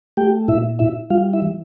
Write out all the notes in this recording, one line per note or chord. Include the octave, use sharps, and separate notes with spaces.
A3 G4 G5
A#2 E4 E5
E4 E5
G3 F4 F5
E4 E5
E3